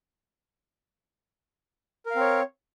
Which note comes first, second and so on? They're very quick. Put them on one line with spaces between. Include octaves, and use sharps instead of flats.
A#4 F5 C4 C#5